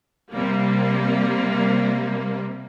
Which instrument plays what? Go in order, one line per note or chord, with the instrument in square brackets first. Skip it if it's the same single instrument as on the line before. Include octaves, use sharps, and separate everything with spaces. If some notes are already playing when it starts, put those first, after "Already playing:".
[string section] C3 G3 A#3